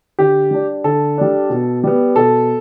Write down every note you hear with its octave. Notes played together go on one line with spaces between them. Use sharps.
D3 G4
G3 D4
D3 A4
G3 D4
B2
G3 B3
B2 A4